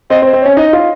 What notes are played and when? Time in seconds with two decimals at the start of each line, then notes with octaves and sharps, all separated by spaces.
0.10 C4 D#5
0.22 C4
0.26 C5
0.33 C4
0.41 C#4 C#5
0.57 D#4 D#5
0.73 F4